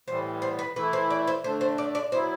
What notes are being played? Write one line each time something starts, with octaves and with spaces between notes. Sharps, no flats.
A2 E3 G3 B3 C5
C5
B4
E3 A3 E4 B4
C5
D5
C5
D3 A3 D4 C5
C5
D5
D5
F#3 B3 E4 C5